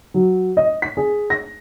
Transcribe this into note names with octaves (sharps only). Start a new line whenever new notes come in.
F#3
D#5
B6
G#4
A#6